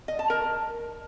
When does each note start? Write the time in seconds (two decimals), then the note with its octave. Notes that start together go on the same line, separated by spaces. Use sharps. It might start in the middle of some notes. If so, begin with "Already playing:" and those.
0.08 D#5
0.19 A5
0.30 A#4